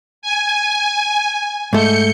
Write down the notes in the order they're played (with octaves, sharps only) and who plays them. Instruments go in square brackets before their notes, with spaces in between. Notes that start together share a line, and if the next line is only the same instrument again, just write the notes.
[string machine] G#5
[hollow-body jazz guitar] G#2 A3 [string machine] G6 C#7